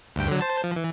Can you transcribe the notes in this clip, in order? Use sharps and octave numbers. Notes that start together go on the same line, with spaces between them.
D2 G2 G5
D3 F#3
C5 A5
F3
E3